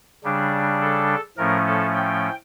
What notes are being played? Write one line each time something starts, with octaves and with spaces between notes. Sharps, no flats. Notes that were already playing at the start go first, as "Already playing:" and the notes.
C#3 G3 D4
A4
A2 F3 A3 C#4 A#4
A4
G5